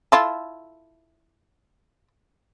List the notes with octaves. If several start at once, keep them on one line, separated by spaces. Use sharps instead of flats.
E4 F4 A4